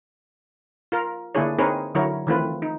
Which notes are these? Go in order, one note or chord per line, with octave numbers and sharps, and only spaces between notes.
F4 A#4
D3 A#3 D4 E4 G#4 C#5
C4 D#4 G#4 A#4 B4 C#5
D3 F#3 E4 F#4 A#4 C#5
D#3 E3 A3 C4 F4 B4
D#4